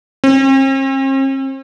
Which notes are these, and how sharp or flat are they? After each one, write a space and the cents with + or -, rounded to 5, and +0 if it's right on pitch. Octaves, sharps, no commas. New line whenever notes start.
C4 +45